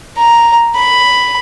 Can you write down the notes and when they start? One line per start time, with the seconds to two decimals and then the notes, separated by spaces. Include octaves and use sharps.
0.18 A#5
0.75 B5